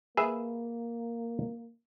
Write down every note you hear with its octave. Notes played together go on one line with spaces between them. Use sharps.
A#3 G#4 B4 E5